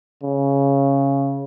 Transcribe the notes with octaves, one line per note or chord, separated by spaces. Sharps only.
C#3